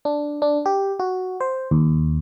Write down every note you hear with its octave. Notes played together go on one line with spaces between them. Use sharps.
D4
D4
G4
F#4
C5
D#2